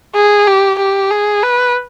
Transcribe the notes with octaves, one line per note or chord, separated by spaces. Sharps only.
G#4
G4
G4
G#4
B4